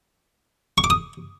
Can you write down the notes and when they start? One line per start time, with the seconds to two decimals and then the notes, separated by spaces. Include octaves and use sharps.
0.78 C#6
0.84 D6
0.90 D#6